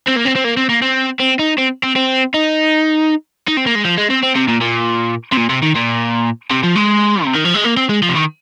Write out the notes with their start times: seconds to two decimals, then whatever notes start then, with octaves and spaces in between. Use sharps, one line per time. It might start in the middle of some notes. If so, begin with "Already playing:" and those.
0.07 C4
0.16 A#3
0.25 C4
0.35 C4
0.44 A#3
0.57 C4
0.69 A#3
0.82 C4
1.20 C4
1.39 D#4
1.58 C4
1.83 C4
1.96 C4
2.34 D#4
3.48 D#4
3.57 C4
3.66 A#3
3.75 G#3
3.85 F3
3.98 G#3
4.10 C4
4.23 C4
4.36 C3
4.48 A#2
4.61 A#2
5.33 C3
5.37 A#2
5.49 C3
5.62 D#3
5.75 A#2
6.51 C3
6.63 F3
6.76 G#3
7.25 C3
7.35 D#3
7.45 F3
7.55 G#3
7.64 A#3
7.77 C4
7.89 G#3
8.02 F3
8.09 C3
8.15 D#3